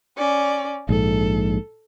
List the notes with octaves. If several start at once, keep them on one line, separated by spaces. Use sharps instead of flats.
C#4 D5
A#1 G#2 A4